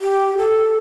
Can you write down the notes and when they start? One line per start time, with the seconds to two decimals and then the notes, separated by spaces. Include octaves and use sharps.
0.01 G4
0.38 A4